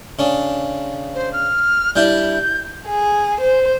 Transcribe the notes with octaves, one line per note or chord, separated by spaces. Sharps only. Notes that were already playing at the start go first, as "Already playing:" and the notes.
C#3 D4
C5
F6
G3 D4 E4 G6
G#4
C5